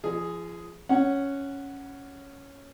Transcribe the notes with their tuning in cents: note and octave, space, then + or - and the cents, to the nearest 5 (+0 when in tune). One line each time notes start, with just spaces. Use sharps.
F3 -35 G#4 +0
C#4 +0 F#5 +0